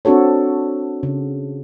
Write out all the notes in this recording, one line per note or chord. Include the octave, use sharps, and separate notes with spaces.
C4 D4 F#4 A4 C#5
C#3